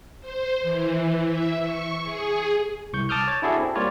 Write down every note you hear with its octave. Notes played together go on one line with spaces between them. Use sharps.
C5
E3
E5
C#6
G#4
C2 C#6 G6
A5 D6 D#6 F6 G6
C#5 A6
D4 E4 F#4 G#4 A4 D5
C4
G3 A#3 F4 C#5 D5